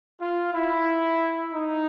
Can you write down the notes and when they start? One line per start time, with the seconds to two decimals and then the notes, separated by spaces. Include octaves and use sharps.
0.20 F4
0.53 E4
1.53 D#4